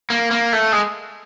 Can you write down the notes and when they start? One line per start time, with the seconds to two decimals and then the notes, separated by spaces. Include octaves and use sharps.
0.10 A#3
0.31 A#3
0.53 A3
0.72 G#3